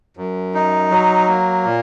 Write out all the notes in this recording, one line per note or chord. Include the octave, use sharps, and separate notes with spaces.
F#2
D#4
F#3
A#3
A#2